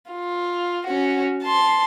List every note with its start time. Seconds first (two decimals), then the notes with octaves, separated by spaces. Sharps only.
0.11 F4
0.87 C#4 F#4
1.43 A5 C6